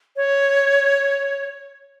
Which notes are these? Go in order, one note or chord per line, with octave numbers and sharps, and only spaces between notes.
C#5